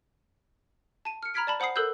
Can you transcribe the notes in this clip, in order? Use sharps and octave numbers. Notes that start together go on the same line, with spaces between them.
A5 D#7
F6 C#7
A#5 B5 F6 G#6 B6 D7
D5 A5 B5
C5 F#5 B5 D#6 C7
A4 A#4 D#6 E6 F#6 G6